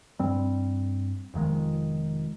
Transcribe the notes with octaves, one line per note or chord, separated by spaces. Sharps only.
G2 G3 C4
F1 F2 D#3 G#3